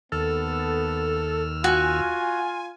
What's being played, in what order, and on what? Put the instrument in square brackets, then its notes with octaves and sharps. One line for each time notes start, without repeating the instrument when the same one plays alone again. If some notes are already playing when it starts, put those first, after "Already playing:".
[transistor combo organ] D#2 E6 F6 [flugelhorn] B3 [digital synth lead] A4
[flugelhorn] F4 [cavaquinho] F#4 [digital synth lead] G#5